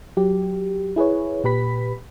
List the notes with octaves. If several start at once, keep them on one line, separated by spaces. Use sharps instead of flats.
F#3 G4
E4 G#4 B4 C#5
A#2 G4 B4 B5 B6